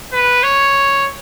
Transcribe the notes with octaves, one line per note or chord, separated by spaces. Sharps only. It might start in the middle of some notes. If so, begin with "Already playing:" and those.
B4
C#5